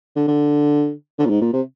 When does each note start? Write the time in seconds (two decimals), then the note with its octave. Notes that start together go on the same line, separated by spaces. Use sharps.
0.16 D3
0.28 D3
1.19 D3
1.25 A#2
1.30 G#2
1.41 A#2
1.53 C3